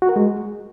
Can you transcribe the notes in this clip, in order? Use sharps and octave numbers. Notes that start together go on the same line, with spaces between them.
F#4
A#4
G#3